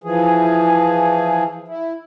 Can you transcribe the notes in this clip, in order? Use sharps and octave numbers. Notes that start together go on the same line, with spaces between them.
E3 F3 G#4
E4